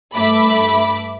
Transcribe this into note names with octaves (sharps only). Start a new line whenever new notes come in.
G2 A3 E5 B5 D6